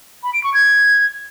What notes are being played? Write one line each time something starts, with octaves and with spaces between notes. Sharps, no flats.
B5
D7
C#6
G#6